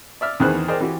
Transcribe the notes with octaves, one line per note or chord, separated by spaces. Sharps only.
D5 E5 F6
E2 D#3 B3 G#4 C5 F#6
G#4 A#4 C5 D5 D#5 G5
E3 F#4 G4